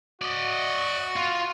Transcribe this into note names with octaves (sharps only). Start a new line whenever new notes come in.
F#4 D5 D#5
F4